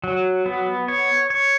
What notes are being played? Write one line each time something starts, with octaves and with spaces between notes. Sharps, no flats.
F#3
B3
C#5
C#5